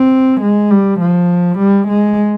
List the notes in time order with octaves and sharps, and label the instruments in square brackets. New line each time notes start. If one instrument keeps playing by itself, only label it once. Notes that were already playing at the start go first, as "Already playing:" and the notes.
Already playing: [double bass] C4
G#3
G3
F3
G3
G#3